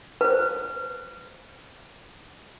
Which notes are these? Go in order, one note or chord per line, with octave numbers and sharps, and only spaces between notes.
B4 C5